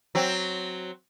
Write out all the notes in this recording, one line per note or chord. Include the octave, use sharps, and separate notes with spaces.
F#3 C4